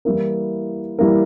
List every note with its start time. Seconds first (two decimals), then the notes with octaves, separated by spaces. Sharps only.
0.05 E3 G3 A#3 E4 A#4
0.99 E3 G3 A#3 E4 A#4